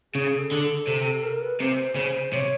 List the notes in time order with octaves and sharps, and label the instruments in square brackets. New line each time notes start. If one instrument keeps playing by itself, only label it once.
[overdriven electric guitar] C#3 [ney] G#4
[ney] A4
[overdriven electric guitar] D3
[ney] A4
[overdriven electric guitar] C3 [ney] A4
[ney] A4
A#4
B4
[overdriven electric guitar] C3 [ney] C5
[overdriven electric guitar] C#3 [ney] C5
[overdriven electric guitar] C3 [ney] C#5